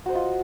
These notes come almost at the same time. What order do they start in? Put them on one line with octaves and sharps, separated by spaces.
F#4 C5 D#5 F4